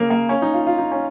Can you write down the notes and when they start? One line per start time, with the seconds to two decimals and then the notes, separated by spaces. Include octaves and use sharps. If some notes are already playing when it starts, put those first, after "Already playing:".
Already playing: C#3 A#3
0.10 A#3
0.29 C#4
0.42 D#4
0.54 F4
0.67 F4
0.78 D#4
0.92 C#4